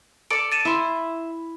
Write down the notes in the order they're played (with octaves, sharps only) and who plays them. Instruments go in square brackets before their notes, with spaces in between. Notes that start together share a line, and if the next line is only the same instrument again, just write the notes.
[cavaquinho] A4 D5 A5 [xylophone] C#7 D7
[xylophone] A6 D#7 E7
[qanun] E4 [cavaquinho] E5 C6